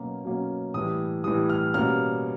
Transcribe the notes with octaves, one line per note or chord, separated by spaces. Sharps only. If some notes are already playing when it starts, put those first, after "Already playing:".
Already playing: B2 F#3 A#3 C#4
B2 F#3 A#3 C#4
A2 E3 G3 D#6
A2 E3 G3 D#6
F6
B2 G3 A#3 C#4 F6